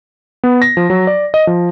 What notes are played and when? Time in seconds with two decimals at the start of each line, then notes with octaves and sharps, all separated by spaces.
0.44 B3
0.62 A#6
0.77 F3
0.90 F#3
1.07 D5
1.34 D#5
1.47 F3